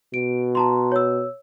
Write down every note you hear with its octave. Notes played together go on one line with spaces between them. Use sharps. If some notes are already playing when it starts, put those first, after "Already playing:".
B2 D7
A5 A#5 C6
C#5 E6